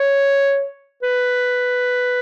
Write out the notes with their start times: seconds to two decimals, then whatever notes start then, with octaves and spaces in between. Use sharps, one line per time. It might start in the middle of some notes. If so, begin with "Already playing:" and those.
Already playing: C#5
1.02 B4